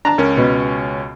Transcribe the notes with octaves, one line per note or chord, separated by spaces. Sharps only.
D4 A5 A#5
C#2 C#4 A#4
B2